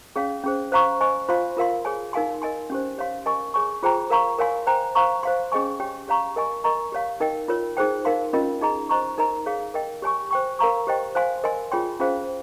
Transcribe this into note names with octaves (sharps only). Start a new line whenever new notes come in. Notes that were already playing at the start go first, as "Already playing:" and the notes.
C#4 G#4 C#5 F5
C#4 G#4 C5
C5 F5 A#5 C#6
C5 D#5 G#5 C#6
F4 C5 F5 C6
F4 A#4 F5 C6
G#4 C#5 G#5
D#4 A#4 F5 G#5 C6
A#4 D#5 G#5 C6
C#4 G4 C5
G4 C#5 F5 C6
A#4 D#5 G#5 C#6
G#4 C#5 G#5 C#6
F4 G#4 C5 G5 A#5
A#4 F5 A#5 C#6
A#4 C#5 F5 G#5 C6
C5 G5 A#5
C5 F5 A#5 C#6
C5 F5 C6
C#4 G#4 D#5 G#5 C#6
G4 C#5 G5
G4 C#5 F5 A#5 C#6
A#4 D#5 G#5 C#6
A#4 D#5 A#5 C#6
G4 C#5 F5
D#4 A#4 D#5 G5
F4 A#4 C#5
D#4 G#4 C5 G5
D#4 A#4 F5 C6
C#4 F4 A#4 D#5
D#4 G#4 D#5 A#5
C5 D#5 A#5 C#6
D#4 A#4 D#5 A#5
G#4 C#5 F5
A#4 D#5 G5
G4 C#5 G#5 C#6
C5 G5 C#6
A#4 F5 A#5 C#6
G4 C5 D#5 G5
C5 F5 G#5 C6
A#4 D#5 G#5 C6
F4 G#4 C#5 G5 C6
C#4 F4 G#4 C5 F5